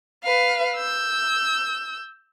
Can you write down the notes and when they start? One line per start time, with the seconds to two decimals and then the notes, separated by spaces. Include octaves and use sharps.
0.23 B4 F5
0.76 E6 G6